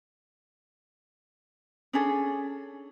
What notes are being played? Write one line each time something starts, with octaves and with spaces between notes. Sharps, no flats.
C#4 D4 G#4 A4